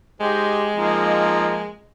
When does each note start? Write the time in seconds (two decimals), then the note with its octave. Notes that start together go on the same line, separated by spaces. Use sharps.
0.21 G#3 D#4 G4 C5
0.75 F3 A#3 C4 D#4